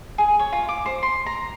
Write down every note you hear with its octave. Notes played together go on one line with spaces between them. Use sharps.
G#4
C#5
F4
D6
C5
C6
A#5